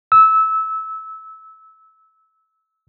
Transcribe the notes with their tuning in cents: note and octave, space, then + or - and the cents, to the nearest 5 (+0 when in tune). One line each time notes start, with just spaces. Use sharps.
E6 -20